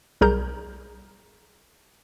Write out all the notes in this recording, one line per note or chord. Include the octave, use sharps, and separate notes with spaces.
B1 G3 G#4 A#4 A#5 G6